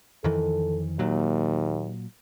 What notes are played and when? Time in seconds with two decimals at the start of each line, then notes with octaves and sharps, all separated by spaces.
0.24 F2 D#3 E3 A4
0.99 D#2 A#2 F#3